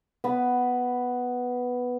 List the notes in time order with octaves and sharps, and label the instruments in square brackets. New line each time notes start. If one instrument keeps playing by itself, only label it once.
[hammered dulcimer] B3 B5